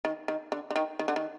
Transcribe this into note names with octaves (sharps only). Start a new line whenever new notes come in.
D#3
D#3
D3
D3
D#3
D#3
D3
D#3